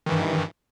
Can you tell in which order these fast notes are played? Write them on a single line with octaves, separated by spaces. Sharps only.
D#3 E3 G2